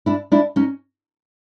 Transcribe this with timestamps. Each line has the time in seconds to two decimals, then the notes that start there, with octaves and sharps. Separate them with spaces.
0.06 D4 E4
0.32 D4 E4
0.56 C#4 D#4